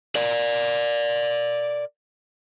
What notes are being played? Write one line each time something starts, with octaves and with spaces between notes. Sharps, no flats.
A#4 D5